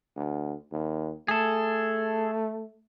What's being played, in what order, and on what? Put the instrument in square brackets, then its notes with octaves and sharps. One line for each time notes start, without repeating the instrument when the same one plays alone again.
[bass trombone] D2
D#2
[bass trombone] A3 [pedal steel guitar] G#4 A4